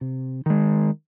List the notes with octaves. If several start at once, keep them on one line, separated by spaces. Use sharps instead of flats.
C3
D#3 G#3